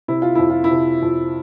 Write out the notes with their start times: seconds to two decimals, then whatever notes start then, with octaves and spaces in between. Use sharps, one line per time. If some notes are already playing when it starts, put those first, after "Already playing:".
0.08 C3 E4
0.22 F4
0.35 F2 E4
0.50 F4
0.64 E4
0.71 C3
1.02 F2